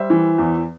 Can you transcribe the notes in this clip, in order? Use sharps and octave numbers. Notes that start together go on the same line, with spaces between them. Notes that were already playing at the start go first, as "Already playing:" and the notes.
Already playing: G3 C5 E5
E3
E2